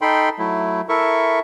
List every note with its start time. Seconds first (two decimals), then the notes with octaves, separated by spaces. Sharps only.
0.01 D#4 A4 G5 B5 C6
0.39 F#3 A3 E4
0.89 E4 A4 A#4 E5 C#6